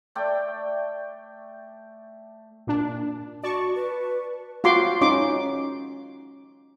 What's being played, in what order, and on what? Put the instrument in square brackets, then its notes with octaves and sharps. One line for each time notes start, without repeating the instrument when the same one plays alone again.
[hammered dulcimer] A3 D5 G5 C#6
[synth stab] A#2 D4
[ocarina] F#4 [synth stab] D5 A5 C#6
[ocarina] B4
[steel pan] F4 F#4 C6 D6
C#4 D#4 D6